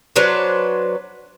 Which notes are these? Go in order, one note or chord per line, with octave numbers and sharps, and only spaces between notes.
F#3 D4 B4 C5